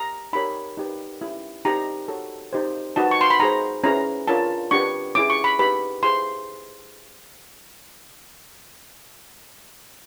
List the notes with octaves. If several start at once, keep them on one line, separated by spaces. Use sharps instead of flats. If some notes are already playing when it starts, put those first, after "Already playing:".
Already playing: G4 A#5
D#4 G4 A#4 C#5 B5
D#4 G4 B4
C#4 E4 G4
D#4 G4 C5 A#5
F#4 A4 C#5
D#4 G4 C5
D#4 F#4 B4 A5
C#6
C6
B5
D#4 G#4 C5 A#5
C#4 E4 G#4 B4 A#5
D4 F4 A#4 C#5 A5
D4 G4 B4 C#6
C#4 E4 G#4 D6
C#6
B5
D#4 G4 B4 B5
E4 G#4 C5 C6